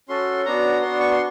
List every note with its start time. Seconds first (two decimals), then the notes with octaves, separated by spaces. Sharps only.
0.09 C#4 F#4 A4 C6
0.45 B3 D4 F#4 A#5
0.81 B3 D4 F#4 C6
1.00 C#6
1.11 C6